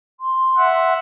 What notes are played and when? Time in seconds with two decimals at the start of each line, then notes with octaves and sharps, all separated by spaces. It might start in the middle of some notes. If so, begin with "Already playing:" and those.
0.20 C6
0.57 E5 F#5